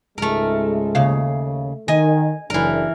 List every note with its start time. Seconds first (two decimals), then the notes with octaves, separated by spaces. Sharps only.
0.18 C#2 G#2 G#3 A3 A#4
0.95 D#2 C#3 F5
1.88 D#3 D#5 G#5
2.50 F#1 E3 D4 A#4